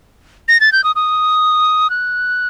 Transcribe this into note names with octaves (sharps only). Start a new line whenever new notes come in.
A#6
A6
G6
D#6
D#6
F#6